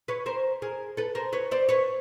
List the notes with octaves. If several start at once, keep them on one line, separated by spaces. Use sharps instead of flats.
B4 C#5
A#4 C5
G#4 A#4
A4 B4
A#4 C5
B4 C#5
C5 D5
B4 C#5